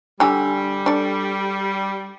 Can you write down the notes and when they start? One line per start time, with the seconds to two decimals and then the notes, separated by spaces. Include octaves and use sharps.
0.20 D3 G3 G4 G#5 E6
0.86 D4 A4